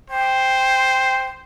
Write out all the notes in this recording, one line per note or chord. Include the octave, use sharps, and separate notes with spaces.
C5 G5